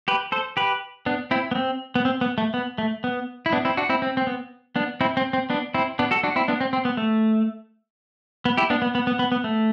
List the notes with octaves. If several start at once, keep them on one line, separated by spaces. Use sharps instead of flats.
G4 B4
A4 C5
G4 B4
B3 D4
C4 E4
B3
C4
B3
C4
B3
A3
B3
A3
B3
E4
B3 D4
C4 E4
D4 F#4
C4 E4
C4
C4
B3
B3 D4
C4 E4
C4
C4
B3 D4
C4 E4
B3 D4
F#4 A4
D4 F#4
C4 E4
B3 D4
C4
C4
B3
A3
B3
E4 G4
B3 D4
B3
B3
B3
B3
B3
A3